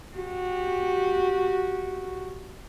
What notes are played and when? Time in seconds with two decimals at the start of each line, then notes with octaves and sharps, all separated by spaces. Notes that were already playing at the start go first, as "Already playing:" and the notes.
0.15 F#4 G4